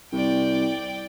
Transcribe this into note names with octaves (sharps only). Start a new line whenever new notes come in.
C2 D5 G5